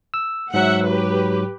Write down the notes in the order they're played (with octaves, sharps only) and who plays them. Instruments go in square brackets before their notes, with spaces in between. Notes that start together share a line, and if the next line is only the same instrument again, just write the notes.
[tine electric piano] E6
[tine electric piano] G#2 F#3 [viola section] E5 F#5
[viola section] G4 B4